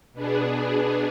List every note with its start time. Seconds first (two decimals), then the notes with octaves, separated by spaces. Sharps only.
0.13 B2 B3 D4 G#4